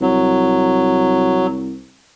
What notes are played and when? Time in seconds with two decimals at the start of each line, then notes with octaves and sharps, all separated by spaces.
0.01 C2 F#3